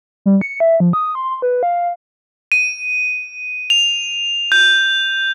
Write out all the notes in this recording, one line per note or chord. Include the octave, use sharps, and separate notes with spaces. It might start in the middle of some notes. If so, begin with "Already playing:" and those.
G3
C#7
E5
F3
D#6
C6
B4
F5
D#7
F7
G6